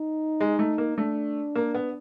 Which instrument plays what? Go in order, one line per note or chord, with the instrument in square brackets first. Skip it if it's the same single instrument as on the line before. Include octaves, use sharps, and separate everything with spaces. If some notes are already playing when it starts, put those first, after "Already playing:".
Already playing: [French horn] D#4
[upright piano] G#3
A3
A#3
[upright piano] A3 [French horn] D4
[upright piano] A#3
B3